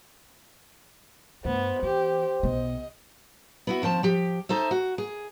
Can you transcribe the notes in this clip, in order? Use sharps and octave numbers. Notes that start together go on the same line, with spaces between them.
G2 A3 B3 C5
E3 G4
B1 B3 D#5
B3 E4 F#4
D#2 F3 C4 A5
F3 G4
D#4 A4 C5 E5
F#4
G#4